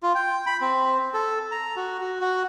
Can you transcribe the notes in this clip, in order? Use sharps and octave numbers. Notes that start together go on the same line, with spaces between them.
F4
G5
B5
C4
A4
A#5
F#4
F#4
F#4